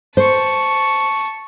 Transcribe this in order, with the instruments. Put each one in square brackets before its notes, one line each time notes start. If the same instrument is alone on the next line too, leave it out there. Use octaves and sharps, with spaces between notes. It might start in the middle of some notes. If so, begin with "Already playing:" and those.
[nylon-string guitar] C5 [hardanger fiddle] A5 C#6